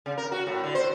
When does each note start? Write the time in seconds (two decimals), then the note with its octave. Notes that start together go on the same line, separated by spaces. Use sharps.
0.06 C#3
0.18 A#4
0.32 F#4
0.47 A2
0.64 D3
0.75 C5